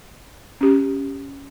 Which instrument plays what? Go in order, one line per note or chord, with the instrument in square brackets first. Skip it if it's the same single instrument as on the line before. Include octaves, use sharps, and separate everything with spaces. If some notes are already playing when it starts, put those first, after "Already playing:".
[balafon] C#4 G4